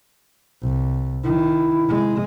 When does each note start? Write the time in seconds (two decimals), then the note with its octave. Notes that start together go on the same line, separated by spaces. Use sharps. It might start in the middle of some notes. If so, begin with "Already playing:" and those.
0.62 C2
1.24 D#3 E4
1.85 C3 G#3